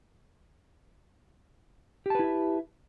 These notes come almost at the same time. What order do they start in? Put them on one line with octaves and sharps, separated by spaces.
G4 A5 B4 E4 E5